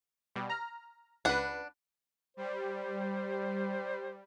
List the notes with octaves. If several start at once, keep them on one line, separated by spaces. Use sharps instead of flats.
B2 G3
A#5 F6
C#2 D4 B4 F#5
G3 C5